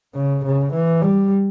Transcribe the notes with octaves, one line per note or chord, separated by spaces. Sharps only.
C#3
C#3
E3
G3